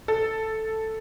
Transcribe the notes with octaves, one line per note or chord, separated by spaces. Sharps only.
A4